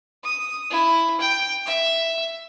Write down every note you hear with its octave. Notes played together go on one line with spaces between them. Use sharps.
D#6
E4
G5
E5